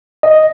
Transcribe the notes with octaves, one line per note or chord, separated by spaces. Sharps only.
D#5